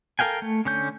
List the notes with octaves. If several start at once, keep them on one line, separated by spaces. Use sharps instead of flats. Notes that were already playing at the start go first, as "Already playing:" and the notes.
A4 A#4 F5 G5 G#5
A3
D3 C#4 G6